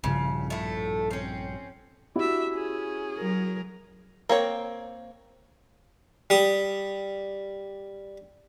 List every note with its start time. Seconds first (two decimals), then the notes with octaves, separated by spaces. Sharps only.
0.04 A#1 G2 C#3 F3
0.50 A2 A3
1.11 C4 C#4
2.16 D4 E4 F#4 G4 E5
2.51 C#4 G#4
3.18 F#3 A#4
4.29 A#3 C4 C#5
6.30 G3 D#6